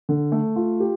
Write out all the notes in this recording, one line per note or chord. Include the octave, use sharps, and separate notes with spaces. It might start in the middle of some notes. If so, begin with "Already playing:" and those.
D3
A3
F4
G4